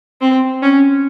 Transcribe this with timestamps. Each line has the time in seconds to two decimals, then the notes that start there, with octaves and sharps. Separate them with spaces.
0.21 C4
0.62 C#4